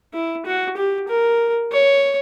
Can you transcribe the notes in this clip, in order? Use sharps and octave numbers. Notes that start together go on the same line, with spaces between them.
E4
F#4
G4
A#4
C#5